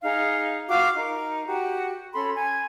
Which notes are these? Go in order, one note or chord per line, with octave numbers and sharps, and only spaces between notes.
D#4 G#4 F5
F4 F#4 F5 D6
D#4 A#4
F#4 G4
C#4 A4 B5 C6
G#5